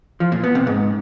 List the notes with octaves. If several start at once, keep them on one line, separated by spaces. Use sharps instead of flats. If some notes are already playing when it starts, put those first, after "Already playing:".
F3
A#2
B3
C3
G#2